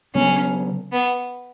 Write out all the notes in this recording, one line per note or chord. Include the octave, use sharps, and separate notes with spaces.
C#3 F#3 B3 C#4
B3